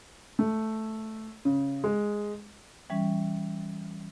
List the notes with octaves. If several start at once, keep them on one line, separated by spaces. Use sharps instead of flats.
A3
C#3
G#3
E3 G3 C#4